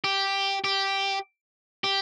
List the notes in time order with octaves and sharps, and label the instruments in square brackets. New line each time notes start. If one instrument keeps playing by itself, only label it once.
[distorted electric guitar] G4
G4
G4